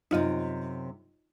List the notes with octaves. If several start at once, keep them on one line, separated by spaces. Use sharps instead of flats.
F#2 A2 C3 D#4 F4 D#5